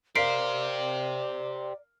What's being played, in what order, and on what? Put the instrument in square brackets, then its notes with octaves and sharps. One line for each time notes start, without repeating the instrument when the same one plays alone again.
[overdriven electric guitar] G4 C5 [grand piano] A#4 F5 [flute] D5 [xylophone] B6 C7 D7